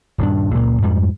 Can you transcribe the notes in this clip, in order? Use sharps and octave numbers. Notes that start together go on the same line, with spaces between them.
D#1 G2 D4
C#2 A#2 A#3
F2 G#2 G3